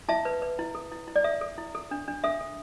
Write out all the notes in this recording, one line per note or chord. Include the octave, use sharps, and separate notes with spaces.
E4 E5 A5
B4
B4
E4
A4
E4
E4
D5
A4 E5
A4
E4
A4
D4
D4
A4 E5
A4